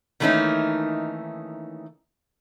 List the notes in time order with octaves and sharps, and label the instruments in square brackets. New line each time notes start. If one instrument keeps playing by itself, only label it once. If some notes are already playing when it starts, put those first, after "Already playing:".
[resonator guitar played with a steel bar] D#3 E3 A3 A#3 C#4 D#4